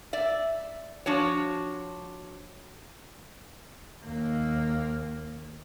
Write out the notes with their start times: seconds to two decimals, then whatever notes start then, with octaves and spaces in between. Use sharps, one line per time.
0.13 D5 E5
1.06 F3 D4 F#4 C#5
4.05 D#2 A#3